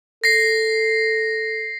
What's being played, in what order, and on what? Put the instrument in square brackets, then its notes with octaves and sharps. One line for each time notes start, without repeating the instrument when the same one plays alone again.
[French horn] A4 [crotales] A#6 C7